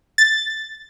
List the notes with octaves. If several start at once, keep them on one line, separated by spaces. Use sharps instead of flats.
A6